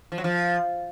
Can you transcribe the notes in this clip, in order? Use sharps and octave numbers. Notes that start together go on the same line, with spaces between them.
F3
F#3
F3